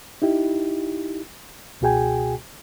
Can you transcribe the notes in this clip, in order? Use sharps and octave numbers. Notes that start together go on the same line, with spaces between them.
D#4 E4 G4
C#2 B2 F#4 G#4 G5 G#5